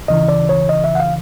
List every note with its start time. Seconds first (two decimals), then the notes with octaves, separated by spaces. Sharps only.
0.08 D2 C#3 E3 D#5
0.28 D5
0.49 C#5
0.69 D#5
0.84 E5
0.95 F#5
1.00 F5